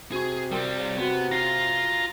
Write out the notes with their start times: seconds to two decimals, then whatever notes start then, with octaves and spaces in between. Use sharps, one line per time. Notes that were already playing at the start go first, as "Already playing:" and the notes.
0.12 C3 F#4 G#4 C#6
0.51 G3 C4 A#4 G5 C6
0.76 G#4 C#5 F5
0.97 B3 F#4 G4
1.31 F4 F5 A#5